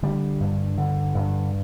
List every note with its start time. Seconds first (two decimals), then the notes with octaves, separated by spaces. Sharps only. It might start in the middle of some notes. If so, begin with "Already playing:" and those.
0.03 D3 G3
0.40 G2
0.78 D3
1.15 G2